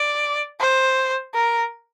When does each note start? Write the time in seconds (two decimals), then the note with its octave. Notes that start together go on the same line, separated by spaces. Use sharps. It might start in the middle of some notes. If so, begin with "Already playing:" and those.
Already playing: D5
0.60 C5
1.34 A#4